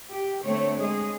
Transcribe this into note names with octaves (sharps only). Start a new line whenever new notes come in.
G4
D3 A3 C4 C#5
G#3 G#4